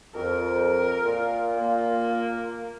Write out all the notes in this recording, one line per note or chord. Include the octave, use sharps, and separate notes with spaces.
F2 A#4
A#2 F4
A#3